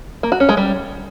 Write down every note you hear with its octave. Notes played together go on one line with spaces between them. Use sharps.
A#3
F#4
C#4
G#3
G3